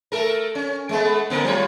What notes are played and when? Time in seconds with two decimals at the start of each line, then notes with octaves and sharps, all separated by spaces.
0.12 A3 A4 A#4
0.55 C#4
0.89 G#3 A3 B3
1.30 D3 A#3 A#4
1.45 F#3 F4 C#5